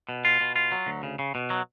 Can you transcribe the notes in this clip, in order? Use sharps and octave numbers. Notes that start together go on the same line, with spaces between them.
B2
F4
B2
F4
F#3
D2
C#3
C#3
B2
F#3